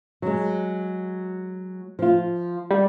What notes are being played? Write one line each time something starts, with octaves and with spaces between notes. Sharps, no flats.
F#3 G#3
F3 F4
G3